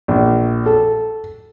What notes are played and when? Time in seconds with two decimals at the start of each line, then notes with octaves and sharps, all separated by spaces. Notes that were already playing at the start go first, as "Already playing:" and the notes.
0.08 A#1
0.66 A4